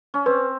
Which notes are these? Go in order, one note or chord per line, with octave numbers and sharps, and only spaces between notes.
C#4
C4 B4